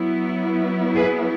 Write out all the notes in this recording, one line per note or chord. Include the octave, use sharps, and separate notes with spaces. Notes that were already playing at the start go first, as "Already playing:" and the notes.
Already playing: F#3 B3 E4
G#4 B4